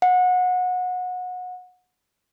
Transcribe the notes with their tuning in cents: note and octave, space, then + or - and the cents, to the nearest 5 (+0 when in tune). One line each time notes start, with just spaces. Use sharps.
F#5 -25